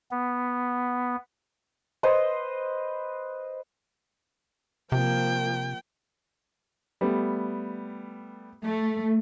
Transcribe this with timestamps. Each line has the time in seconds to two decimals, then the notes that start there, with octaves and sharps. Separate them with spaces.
0.11 B3
2.03 B4 C5 D#5
4.92 C3 F3 A#3 G5
7.01 G3 A3 B3
8.64 A3